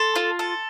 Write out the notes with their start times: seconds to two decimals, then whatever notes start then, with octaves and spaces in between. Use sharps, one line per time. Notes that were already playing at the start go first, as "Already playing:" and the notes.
Already playing: A4 C6
0.16 F4
0.39 A4